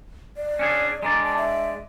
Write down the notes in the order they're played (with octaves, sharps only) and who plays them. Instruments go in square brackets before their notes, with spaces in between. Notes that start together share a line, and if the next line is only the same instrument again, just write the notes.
[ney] D5
[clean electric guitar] C#4 D4 G#4
[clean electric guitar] G#3 D4 D5 [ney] A#5
[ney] A5
E5